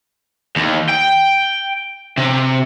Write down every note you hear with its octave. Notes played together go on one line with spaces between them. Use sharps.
D#2
G5
C3